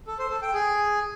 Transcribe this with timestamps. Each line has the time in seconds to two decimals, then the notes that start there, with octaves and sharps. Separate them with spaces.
0.07 A4
0.19 C5
0.30 A4
0.42 G5
0.54 G#4